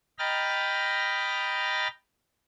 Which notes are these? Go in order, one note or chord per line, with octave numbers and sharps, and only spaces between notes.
D#5 G5 A#5 B5 F6 A6